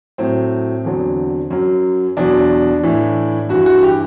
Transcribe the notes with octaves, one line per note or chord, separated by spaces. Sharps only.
A2 F#3 C4
E2 D3 F#3
F#2 F#3
E2 B2 F#3 D4
A2 E3
G2 E3 F#4
F#4
G4